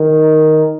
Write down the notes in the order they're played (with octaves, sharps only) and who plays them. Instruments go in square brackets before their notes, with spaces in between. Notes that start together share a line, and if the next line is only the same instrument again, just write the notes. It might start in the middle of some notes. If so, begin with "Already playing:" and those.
Already playing: [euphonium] D#3